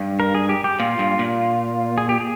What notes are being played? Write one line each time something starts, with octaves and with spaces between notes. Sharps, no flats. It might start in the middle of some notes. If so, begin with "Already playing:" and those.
Already playing: G2
A#4
G#4
G4
G4
A#2 F4
G2
A#2
G#4
G4
G#4